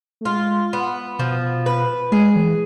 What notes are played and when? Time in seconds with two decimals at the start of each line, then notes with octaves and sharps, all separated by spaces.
0.21 A3
0.25 G#3 F4
0.73 B3
1.19 B2 F3
1.66 B4
2.12 G#3 G#4
2.36 E3